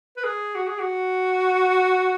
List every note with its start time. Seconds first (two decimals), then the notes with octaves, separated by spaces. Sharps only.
0.17 B4
0.24 G#4
0.55 F#4
0.67 G#4
0.79 F#4